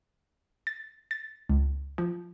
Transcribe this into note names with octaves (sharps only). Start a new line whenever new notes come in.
A6
A6
C#2
F3